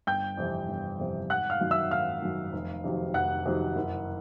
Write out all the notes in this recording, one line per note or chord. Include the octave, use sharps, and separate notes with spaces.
G1 G5 G6
F2 C3 E3
G1
F2 C3 E3
G#1 F#5 F#6
F5 F6
F#2 D#3 F#3
E5 E6
G#1 F5 F6
F#2 D#3 F#3
F1
F2 C3 D#3 F#3
F1 F#5 F#6
F2 C3 D#3 F#3
F#1